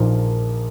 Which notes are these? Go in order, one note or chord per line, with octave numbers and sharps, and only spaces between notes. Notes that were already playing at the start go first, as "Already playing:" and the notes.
Already playing: A#1 A#2 F3 A#3 D#4